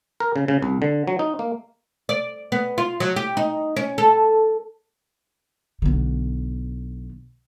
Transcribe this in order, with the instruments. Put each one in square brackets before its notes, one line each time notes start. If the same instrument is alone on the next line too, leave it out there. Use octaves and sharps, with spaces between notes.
[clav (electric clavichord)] A#4
C#3
C#3
C2
D3
F#3
D#4
A#3
[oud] D5
B3
F4
F#3
G4
D#4
C#4
A4
[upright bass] B1 D3